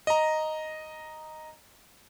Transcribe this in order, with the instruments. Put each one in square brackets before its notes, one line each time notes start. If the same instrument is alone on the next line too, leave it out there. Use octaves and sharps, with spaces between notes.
[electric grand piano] D#5 A#5